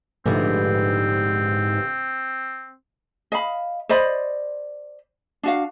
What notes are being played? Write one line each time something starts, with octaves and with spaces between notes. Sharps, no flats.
A#1 G#2 D3 E3 G3 A3 B3 C4
D#5 F5 B5
C5 D5 D#5 B5
D4 F#4 F5